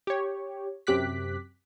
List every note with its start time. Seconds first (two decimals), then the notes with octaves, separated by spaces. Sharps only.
0.07 G4 C#5
0.87 F#2 C3 G4 D6 F#6 B6